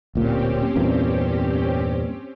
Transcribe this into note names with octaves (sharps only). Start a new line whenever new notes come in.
D1 A#2 C4 C#4 G4
E2 G2 A#2